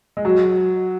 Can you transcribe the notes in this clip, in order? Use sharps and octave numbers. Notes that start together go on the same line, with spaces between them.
G#3
F#3